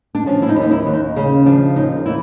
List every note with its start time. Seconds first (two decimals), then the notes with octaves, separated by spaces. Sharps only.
0.15 D4
0.26 F3 C#4
0.42 E4
0.48 D#4
0.56 D#2
0.62 D#4
0.71 E4
0.87 D#2
0.93 D#4
1.16 C#3 C#4
1.46 F3 D4
1.76 D#2 D#4
2.06 E3 E4